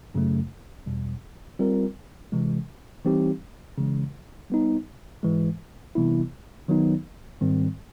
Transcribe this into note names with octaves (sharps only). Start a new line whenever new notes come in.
F#2 C#3 F#3 A3
E2 B2 G3
G3 C4 F4 A#4
C3 E3 G#3
E3 G3 C4 D#4 G4
C#3 E3 G#3
G3 B3 D#4
G#2 E3 G#3
C3 E3 G3 B3 E4
D#3 F#3 B3 D#4
G#2 D#3 G3 C4